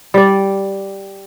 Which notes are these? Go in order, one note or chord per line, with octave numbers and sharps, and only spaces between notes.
G3 D5